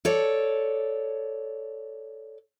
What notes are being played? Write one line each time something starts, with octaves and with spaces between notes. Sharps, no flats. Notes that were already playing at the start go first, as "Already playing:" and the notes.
A4 C#5 D5